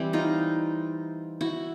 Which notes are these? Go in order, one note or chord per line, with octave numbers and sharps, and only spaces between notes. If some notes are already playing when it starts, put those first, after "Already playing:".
Already playing: E3 G3 C4
D#4 F4
E4 F#4